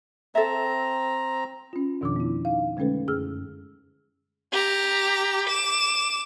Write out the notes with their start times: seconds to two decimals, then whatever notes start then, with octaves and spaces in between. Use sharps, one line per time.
0.35 C4 A4 E5 A#5
1.73 C#4 F4
2.01 F2 B2 D#3 F3 D4 D6
2.16 B3 E4
2.45 D#4 F5
2.77 D3 G#3 A3 C#4 A4 B4
3.08 F#2 G#4 E6 F6
4.53 G4 A#5
5.48 D6 E7